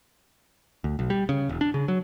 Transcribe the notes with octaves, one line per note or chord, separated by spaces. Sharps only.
D2
B1
G3
C#3
E1
D4
C#3
F#3